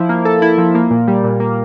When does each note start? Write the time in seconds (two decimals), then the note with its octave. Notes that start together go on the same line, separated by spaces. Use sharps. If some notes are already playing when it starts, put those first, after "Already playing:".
Already playing: F3 E4
0.09 A#3
0.25 A4
0.42 E4
0.58 F3
0.75 A#3
0.91 A#2
1.08 G3
1.24 A#2
1.40 A#3